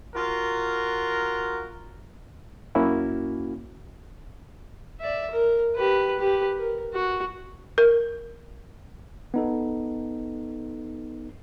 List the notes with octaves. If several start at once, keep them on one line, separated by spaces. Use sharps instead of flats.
F4 F#4 A#4
F#2 A#3 C#4 E4 F#4
D5 E5
A#4
G4 B4
G4 B4
A#4
F#4
A#4
B3 D#4 A4